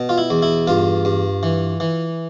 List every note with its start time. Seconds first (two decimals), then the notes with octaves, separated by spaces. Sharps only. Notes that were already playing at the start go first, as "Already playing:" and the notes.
Already playing: B2
0.09 F4
0.18 E4
0.30 E2
0.42 E4
0.67 G2 F4
1.05 G2
1.43 E3
1.80 E3